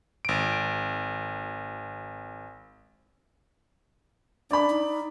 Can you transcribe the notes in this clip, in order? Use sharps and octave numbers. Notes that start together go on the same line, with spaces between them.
G#1 D7
D4 D5 B5
D#4